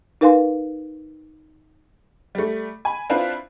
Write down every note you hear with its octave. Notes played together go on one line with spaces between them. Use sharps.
D#4 A#4 B4 F5 G#5 C6
G3 A3
G#5 B5
C4 D4 E4 F4 B4